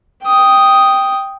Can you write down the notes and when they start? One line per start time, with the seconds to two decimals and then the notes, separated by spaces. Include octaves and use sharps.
0.24 G5 D#6